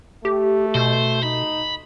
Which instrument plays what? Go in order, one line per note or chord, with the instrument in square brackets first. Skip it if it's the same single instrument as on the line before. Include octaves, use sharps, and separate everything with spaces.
[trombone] A3 [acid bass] G4
[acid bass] B2 [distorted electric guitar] C5
[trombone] D#4 [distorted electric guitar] B5